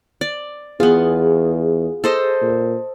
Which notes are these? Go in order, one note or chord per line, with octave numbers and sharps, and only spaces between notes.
D5
E2 B3 F4 G#4
A4 C5 D#5
A#2